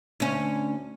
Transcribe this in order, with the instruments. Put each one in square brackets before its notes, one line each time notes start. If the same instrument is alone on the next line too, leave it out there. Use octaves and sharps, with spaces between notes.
[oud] D2 C#4